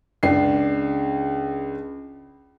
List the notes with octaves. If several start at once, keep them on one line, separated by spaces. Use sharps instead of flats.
C#2 D4 C7